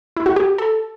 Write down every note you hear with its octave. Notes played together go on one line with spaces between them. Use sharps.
E4
F#4
G4
A4